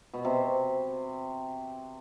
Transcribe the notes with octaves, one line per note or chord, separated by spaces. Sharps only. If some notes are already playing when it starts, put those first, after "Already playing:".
B2
C3